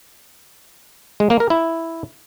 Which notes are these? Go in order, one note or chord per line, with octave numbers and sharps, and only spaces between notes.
G#3
A#3
A#4
E4